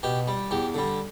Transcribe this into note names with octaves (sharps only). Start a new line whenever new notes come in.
B2 G4
G3
E2 G4
D3 G3